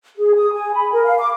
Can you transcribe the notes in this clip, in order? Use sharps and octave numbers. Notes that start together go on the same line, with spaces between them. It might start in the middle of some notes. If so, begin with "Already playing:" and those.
G#4
D#6
G#5
B5
A#4
F5
D6